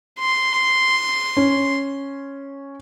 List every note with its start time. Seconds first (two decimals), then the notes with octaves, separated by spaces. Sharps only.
0.19 C6
1.37 C#4